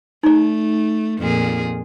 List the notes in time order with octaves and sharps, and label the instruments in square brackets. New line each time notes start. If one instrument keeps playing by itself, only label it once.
[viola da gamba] A3 [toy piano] D#4 D5
[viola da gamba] F2 A#2 G#4